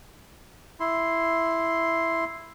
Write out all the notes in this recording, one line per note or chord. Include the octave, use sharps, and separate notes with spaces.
E4 C6